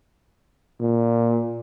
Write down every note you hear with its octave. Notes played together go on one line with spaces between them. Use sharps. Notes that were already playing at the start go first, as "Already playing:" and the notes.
A#2